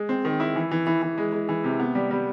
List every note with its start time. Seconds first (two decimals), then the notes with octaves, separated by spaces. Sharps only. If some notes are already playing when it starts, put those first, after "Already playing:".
Already playing: G#3
0.09 C4
0.25 D#3
0.40 E4
0.56 E3
0.71 E3
0.87 E3
1.02 E3
1.18 G#3
1.32 G#3
1.49 E3
1.64 C3
1.80 B3
1.95 G3
2.11 G3